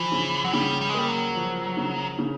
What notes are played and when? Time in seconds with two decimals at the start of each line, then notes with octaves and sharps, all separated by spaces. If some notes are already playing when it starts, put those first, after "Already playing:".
Already playing: E3 F3
0.12 C#3
0.44 F#3
0.53 C#3 G3
0.81 G3
0.89 G#3
0.95 G3 A#3
1.08 F#3
1.36 F3
1.77 C#3
2.19 C#3